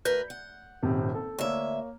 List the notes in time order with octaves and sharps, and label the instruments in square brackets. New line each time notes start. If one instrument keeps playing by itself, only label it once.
[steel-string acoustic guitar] D2 A#4 B4 [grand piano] G6
[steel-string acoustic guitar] F#5
[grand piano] D#1 G#1 C3
A4
[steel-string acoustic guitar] D2 E5 [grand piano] A#3 C#5